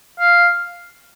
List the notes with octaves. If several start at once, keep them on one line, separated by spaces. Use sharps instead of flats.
F5